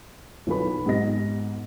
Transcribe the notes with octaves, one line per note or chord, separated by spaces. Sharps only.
B1 E3 F4 A4 B4 B5
G#2 B3 G4 D#5 A#6